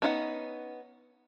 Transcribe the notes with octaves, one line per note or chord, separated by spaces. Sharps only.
B3 C#4 D#4 F5 F#5